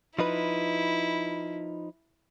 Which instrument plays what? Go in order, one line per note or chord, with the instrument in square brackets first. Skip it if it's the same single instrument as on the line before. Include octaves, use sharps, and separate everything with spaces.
[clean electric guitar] F3 D#4 B4 [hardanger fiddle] E4